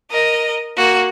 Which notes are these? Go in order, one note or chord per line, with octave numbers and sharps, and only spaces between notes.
A#4 D#5
A#3 F#4